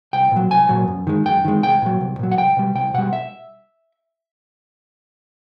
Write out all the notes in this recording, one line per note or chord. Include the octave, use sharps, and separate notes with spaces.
C2 G5
A#2 F#3
C2 G#5
A#2 F#3
F#2
D#3 G#3
F#2 G5
D#3 G#3
C2 G5
A#2 F#3
C2
A#2 F#3
F#5
C2 G5
B2 G3
C2 G5
B2 G3 F#5
E5